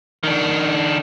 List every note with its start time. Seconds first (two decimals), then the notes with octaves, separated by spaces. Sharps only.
0.24 D#3 D4